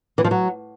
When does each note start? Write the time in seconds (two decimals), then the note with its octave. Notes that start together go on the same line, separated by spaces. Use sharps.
0.18 E3
0.24 F3
0.31 F#3